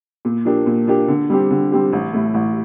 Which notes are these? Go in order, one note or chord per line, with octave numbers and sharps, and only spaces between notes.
A#2
F3 A#3 D4 G4
A#2
F3 A#3 D4 G4
D3
G3 C4 G4
D3
G3 C4 G4
A1
A2 A3
A1